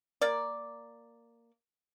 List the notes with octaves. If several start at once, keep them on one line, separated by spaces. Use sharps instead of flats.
A#3 D5